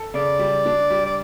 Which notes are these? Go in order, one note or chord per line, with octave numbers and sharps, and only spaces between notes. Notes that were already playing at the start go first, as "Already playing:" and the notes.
Already playing: A4
C#3 D5
G3
D4
G3
D5